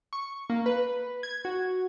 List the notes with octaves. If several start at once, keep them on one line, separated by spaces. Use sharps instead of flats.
C#6
A#3
B4
G#6
F#4